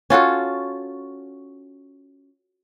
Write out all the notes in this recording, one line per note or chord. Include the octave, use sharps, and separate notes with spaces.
C#4 F4 F#4 A4